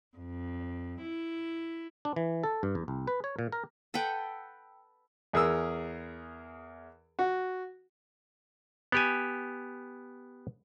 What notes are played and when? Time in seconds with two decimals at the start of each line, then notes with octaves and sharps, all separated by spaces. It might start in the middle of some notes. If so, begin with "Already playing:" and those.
0.18 F2
1.02 E4
2.05 D4
2.16 E3
2.43 A4
2.63 G2
2.75 E2
2.88 C2
3.07 B4
3.24 C#5
3.39 A#2
3.52 A#4
3.94 A4 B4 F#5 G5
5.33 E2 G#4 A#4 E6
7.19 F#4
8.92 B3 G4 G#5